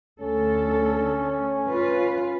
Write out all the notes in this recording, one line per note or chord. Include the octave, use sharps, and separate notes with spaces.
D2 C#4 A4
F4 B4